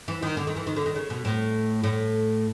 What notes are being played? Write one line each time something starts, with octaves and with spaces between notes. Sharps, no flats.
E3
D#3
D3
D#3
E3
D#3
D3
D#3
C#3
B2
A2
A2